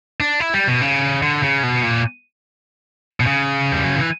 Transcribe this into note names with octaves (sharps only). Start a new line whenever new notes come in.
D4
E4
G3
B2
C#3
D3
C#3
B2
A#2
B2
C#3
G3
F#3
E3